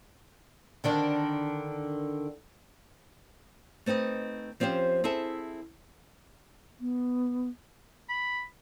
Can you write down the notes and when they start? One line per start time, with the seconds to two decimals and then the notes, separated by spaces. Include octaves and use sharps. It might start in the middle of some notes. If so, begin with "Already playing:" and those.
0.84 D3 D#3 D4
3.86 A3 C4 D#4 B4 D#5
4.60 F3 C4 C#4 G4 C5
5.04 C4 E4 G#4 A4 E5
6.80 B3
8.09 B5